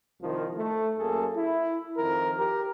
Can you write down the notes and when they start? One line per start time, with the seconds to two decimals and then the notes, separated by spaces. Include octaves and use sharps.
0.21 C2 D#3 F3
0.57 A3
0.98 F#2 A#3 G#4 A4
1.36 E4
1.97 F2 D#3 A#4
2.37 G4 A#4